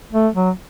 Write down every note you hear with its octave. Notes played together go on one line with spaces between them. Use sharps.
A3
F#3